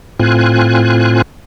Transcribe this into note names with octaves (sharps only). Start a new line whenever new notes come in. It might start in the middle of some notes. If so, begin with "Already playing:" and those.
A2 C4 F4 G#5 F#6